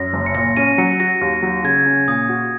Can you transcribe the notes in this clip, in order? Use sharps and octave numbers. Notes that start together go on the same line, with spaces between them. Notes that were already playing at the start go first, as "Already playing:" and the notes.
Already playing: F#2 A#6
F#1
C#7
A#2 A#6
C#4 D#7
F#3 C#7
F#4 A#6
D#2
F#3
C#3 G#6
C#4
A#2 D#6
F#4